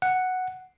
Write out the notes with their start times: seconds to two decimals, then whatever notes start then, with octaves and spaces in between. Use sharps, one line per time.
0.02 F#5